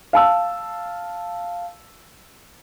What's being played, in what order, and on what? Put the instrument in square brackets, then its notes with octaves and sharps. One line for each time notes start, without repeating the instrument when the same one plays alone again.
[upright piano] F5 A5 E6